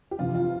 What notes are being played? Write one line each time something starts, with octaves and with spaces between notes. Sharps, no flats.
G4
F2 C3 E3 F4
F4